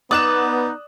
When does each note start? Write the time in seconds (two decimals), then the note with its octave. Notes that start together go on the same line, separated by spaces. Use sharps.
0.11 B3 D#4 D5 D#6 F#6 E7